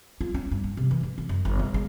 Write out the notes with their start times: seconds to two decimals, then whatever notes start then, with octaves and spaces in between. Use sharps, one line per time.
0.21 F4
0.34 C#4
0.51 G2
0.64 B3
0.77 C3
0.91 E3
1.03 D3
1.18 E4
1.29 F#2
1.45 G1
1.59 C#3
1.74 G#3